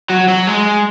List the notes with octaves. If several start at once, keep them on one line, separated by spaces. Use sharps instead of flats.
F#3
F#3
G#3